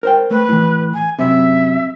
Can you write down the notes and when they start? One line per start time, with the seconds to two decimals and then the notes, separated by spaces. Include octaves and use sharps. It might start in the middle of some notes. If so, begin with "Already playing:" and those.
0.03 A#4 C5 G5
0.31 A3 B4
0.49 A2 E3
0.94 G#5
1.19 F#2 C3 E5